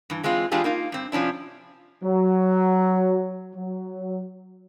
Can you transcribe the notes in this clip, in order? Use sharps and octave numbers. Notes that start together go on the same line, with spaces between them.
G2 E3
E3 G#3 C4 F4
E3 G#3 D4 F4 G4 G#4
A#3 D#4 F4
G2 C4
C3 F3 C#4 D4 E4
F#3
F#3